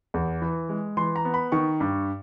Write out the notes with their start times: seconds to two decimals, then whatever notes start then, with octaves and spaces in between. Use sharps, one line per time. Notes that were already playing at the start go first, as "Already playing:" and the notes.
0.14 E2
0.42 E3
0.69 G#3
0.97 E3 C6
1.16 A#5
1.25 B3
1.34 B5
1.52 D#3 C#6
1.80 G2